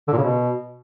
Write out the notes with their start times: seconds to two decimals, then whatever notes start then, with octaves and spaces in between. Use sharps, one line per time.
0.08 D3
0.13 A#2
0.18 C#3
0.23 B2